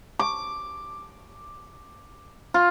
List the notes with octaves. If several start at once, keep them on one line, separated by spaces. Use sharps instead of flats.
D6
F4